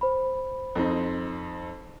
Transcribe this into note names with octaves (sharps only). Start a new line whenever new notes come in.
C5 B5
F2 C4 D#4